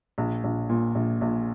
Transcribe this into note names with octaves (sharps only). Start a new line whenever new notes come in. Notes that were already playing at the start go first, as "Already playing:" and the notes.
A#1
A#1
A#2
A#1
A#1